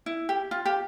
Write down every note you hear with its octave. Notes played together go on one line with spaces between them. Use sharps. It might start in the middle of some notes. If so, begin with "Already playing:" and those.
E4
G4
F4
G4